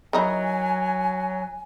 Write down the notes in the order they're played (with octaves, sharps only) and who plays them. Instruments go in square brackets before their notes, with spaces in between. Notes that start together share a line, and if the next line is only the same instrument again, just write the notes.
[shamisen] D#3 D#4 E4 [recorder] F#3 [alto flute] G#5